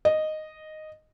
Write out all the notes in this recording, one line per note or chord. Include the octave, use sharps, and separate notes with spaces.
D#5